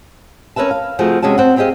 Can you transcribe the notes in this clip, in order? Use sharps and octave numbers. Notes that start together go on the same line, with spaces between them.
C#4 A#4 B4 E5 A5
F5
C3 F3 A3 F4 F#4 G#4
C3 G#3 C#4 F#4 A5
C4 F#5
B3 C4 G4 G#4 D#5 F5